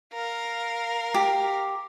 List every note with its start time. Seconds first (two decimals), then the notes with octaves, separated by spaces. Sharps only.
0.13 A#4 F5
1.14 G4